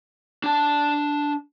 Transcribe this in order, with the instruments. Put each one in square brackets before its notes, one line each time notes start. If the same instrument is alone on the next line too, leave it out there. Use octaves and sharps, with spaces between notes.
[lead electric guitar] D4 A5